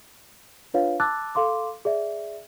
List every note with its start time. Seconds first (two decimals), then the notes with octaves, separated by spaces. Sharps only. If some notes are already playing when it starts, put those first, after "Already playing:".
0.74 D4 F4 B4 C#5 F5
1.00 A5 D6 E6 F#6 A6
1.35 A4 F5 C6 D6
1.85 G#4 D5 E5